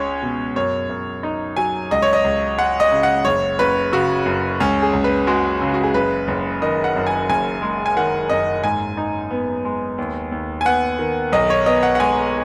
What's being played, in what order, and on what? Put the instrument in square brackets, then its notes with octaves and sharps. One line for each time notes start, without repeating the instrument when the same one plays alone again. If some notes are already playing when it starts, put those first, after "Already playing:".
Already playing: [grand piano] C#2 G#3 C#4 [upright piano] C#5
[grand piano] B2
[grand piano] F#2 [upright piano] C#5
[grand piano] F#2
D#4
[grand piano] F#3 [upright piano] G#5
[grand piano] C#2 [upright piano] D#5
[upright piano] C#5
D#5
[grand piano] C#2
[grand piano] G#3 [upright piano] F#5
[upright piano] D#5
[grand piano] C#3
[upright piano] F#5
[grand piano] F#1 [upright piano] C#5
[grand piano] F#1 [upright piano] B4
[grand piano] C#3 [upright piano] F#4
[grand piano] F#2
[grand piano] C#2 [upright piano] C#4
[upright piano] G#4
[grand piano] C#2
[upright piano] B4
[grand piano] G#3 [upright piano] F#4
[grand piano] C#3
[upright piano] F#4
G#4
[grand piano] F#1 [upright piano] B4
[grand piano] F#1
[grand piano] D#3 [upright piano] D#5
[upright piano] F#5
[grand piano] F#2
[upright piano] G#5
[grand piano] F#1 [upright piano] G#5
[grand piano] G#3
[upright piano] G#5
[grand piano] D#3 [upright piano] F#5
[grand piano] F#2 [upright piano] D#5
[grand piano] G#2 [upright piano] G#5
[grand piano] D#4
B3
G#3
D#2
D#2
[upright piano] G#5
[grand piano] B3 [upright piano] F#5
[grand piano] D#3
[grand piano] B1 [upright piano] D#5
[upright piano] C#5
[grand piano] B3 [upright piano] D#5
[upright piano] F#5
F#5
[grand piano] G#3 [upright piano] G#5